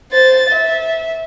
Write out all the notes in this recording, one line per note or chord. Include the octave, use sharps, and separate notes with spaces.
C5 A6
E5